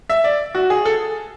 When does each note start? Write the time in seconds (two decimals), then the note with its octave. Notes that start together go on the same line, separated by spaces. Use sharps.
0.10 E5
0.24 D5
0.55 F#4
0.70 G#4
0.85 A4